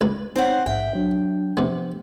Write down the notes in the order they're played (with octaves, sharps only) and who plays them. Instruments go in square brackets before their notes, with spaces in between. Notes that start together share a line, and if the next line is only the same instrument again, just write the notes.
[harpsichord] C#2 B4
[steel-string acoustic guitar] C4 C5 F#5 [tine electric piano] D#4 C#5
[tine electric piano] A#1 G#2 [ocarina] E5 [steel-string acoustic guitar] G5
[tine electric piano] F#3 [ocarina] D4
[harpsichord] C3 B3 [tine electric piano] F3 C5